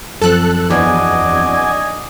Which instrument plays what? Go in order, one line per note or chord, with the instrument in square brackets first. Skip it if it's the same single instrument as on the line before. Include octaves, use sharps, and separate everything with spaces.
[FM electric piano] F#2 F3 C4 [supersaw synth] A4 F#6
[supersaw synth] E2 [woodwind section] D4 D#5 G#5 [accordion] F#4 D6